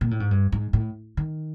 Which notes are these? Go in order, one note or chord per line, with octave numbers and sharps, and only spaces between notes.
A#2
A2
G#2
G2
G#2
A2
D#3